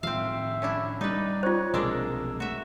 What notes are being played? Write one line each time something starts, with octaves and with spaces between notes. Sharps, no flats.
A2 D#3 F3 C4 E5 F5
C#4 D4 E4
G3 C#4 D#4 B4 D5
F4 C5 C#5
B1 C3 F3 G#3 A#3 D4 E6
A3 F#4 E5